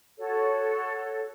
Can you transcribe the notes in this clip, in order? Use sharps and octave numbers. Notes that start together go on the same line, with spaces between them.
F#4 A4 C#5